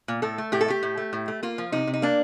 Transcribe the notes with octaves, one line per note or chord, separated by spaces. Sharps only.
A#2
A2 A4
A3
A2 G4
A4
A3 G4
A2
A3
A2
A3
A#3 F4
F3
C3 D#4
C3
D#4
A#3 D4